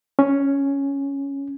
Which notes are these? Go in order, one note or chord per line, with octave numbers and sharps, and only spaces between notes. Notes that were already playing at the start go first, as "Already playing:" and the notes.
C#4